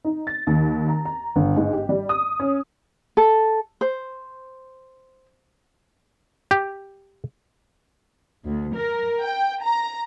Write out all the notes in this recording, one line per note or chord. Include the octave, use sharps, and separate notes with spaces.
D#4
A6
D#2
A#5
A#5
G1
G#2
G4
G3
D#6
C#4
A4
C5
G4
D2
A#4
G5
A#5